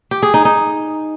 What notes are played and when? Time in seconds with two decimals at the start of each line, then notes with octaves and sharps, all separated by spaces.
0.11 G4
0.23 G#4
0.34 D#4
0.45 D#4